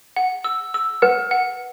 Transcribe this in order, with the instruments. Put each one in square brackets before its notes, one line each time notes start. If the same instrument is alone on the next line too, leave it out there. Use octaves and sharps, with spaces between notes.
[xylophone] F#5
E6
E6
[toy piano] B4 [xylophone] F#5
[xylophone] F#5